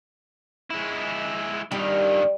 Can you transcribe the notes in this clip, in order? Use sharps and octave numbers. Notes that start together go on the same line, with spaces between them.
G#3 E4
G2 D#3 G3